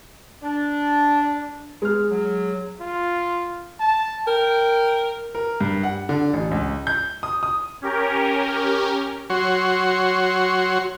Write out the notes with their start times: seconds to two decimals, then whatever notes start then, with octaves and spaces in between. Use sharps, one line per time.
0.43 D4
1.82 G#3 F6
2.10 F#3
2.80 F4
3.80 A5
4.27 A#4 G5
5.35 A#4
5.61 G2
5.83 F#5
6.09 D3
6.33 A1
6.51 C#2
6.87 G6
7.23 D#6
7.43 D#6
7.82 C#4 G4 A#4
9.30 F#3 F#4 C#5 C6